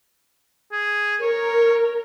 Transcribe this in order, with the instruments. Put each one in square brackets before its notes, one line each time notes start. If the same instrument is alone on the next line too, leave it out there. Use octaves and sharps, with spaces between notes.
[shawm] G#4
[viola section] A#4 [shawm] C#5